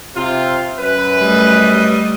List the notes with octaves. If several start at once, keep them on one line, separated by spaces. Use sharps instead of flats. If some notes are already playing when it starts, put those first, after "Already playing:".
C3 F4
F#2 B4
G3 A3 D#5